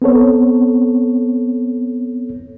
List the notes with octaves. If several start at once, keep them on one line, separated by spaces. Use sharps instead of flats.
B3 C4 A4 C#5